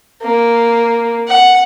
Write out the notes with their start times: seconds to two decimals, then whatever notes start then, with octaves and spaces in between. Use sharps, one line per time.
0.22 A#3
1.28 F#5